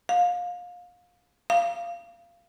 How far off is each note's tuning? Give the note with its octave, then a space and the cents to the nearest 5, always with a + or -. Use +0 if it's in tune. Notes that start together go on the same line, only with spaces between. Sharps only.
F5 +30
F5 -20